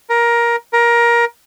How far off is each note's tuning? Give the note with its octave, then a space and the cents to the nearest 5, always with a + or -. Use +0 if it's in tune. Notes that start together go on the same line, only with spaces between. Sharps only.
A#4 +15
A#4 +20